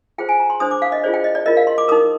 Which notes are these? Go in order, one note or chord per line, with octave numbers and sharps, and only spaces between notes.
F4 G#4 C5 G5
G#5
A#5
C6
D4 G#4 C5 D#6
D6
F5
D#5
F4 G#4 C5 D5
G5
D#5
D5
F4 A#4 D#5
F5
C6
D6
D#4 A#4 D#6